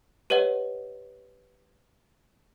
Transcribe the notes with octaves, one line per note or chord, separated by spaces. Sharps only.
G4 B4 C#5 D#5 F#5